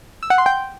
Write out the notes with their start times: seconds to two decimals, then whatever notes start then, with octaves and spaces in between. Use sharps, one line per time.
0.23 E6
0.30 F#5
0.38 C6
0.46 G5